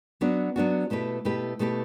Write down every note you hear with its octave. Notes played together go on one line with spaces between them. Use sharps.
F#3 B3 D4 F#4
F#3 B3 D4 F#4
B2 A3 E4 G4 B4
B2 A3 E4 G4 B4
B2 A3 E4 G4 B4